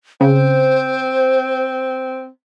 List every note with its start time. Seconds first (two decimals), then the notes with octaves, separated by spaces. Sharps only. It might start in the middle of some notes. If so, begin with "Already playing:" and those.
0.21 C#3 C4 C5